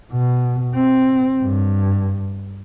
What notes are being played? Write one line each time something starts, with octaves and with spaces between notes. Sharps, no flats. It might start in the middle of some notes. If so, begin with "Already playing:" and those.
B2
C4
G2